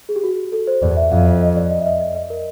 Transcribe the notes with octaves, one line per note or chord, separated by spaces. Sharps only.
G#4
G4
F#4
A4
C5
E2 D5
E5
F2 F5
F5
D#5
D5
D#5
E5
D#5
D#5
D#5
A#4